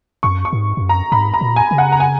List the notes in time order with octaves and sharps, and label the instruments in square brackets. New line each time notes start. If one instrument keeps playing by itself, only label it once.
[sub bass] F#2 [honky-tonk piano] C#6
[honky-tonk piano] C#6
[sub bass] G#2
G#2
F#2
[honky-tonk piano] A#5
[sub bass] G#2 [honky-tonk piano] B5
[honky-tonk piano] A#5
[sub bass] A#2
[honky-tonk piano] G#5
[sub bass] C#3
[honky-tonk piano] F#5
A#5
G#5